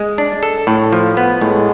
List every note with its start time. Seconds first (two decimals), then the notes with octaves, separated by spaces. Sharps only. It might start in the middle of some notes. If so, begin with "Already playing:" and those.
Already playing: G#3
0.18 D4
0.43 A4
0.67 A2
0.93 F3
1.17 B3
1.41 A2 G#3